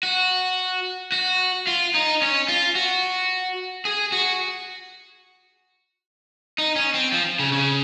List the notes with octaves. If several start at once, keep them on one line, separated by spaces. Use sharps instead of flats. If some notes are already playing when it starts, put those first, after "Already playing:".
F#4
F#4
F4
D#4
C#4
F4
F#4
G#4
F#4
D#4
C#4
C4
F3
C#3
C#3